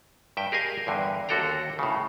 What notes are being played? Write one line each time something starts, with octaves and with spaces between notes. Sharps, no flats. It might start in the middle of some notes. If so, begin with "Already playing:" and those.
G2 E5 G5
G4 G#4 A#4 D#5 F5 G#5
E2 G2 D3
D#2 D3 F#4 A4 G5 A#5
A2 C#3